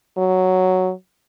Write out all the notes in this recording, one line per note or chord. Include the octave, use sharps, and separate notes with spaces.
F#3